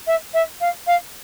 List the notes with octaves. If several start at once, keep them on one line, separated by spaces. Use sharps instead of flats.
E5
E5
F5
F5